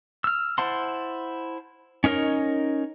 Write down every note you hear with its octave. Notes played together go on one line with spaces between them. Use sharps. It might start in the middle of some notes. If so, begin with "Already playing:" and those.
E6 F6
E4 C5 F#5 A5 C6
C#4 D#4 A#4 C#5 D#5